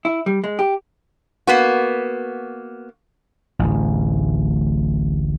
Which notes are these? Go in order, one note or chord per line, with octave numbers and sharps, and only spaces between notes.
E4
G3
G#3
G4
A#3 B3 F#4
D1 A1